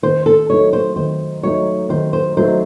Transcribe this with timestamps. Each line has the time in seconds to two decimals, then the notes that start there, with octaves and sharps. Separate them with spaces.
0.03 D#3 C5
0.26 A4
0.50 F#3 A3 D#4 C#5
0.73 C5
0.96 D#3 C5
1.43 F#3 A3 D#4 C#5
1.89 D#3 C5
2.13 C5
2.37 F#3 A3 D#4 C5